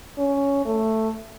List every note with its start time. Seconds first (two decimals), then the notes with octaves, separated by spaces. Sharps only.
0.18 C#4
0.65 A3